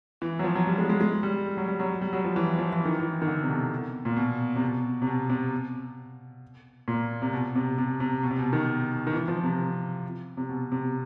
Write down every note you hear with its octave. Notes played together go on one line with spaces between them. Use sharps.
E3
F#3
F3
F#3
G3
G#3
G#3
G#3
G3
F#3
G3
F#3
G3
F#3
F3
E3
F3
E3
D#3
E3
D#3
D3
C3
B2
A#2
B2
C3
B2
C3
B2
C3
A#2
C3
B2
C3
C3
C3
B2
C3
B2
D#3
D#3
E3
F3
C3
C3
B2
C3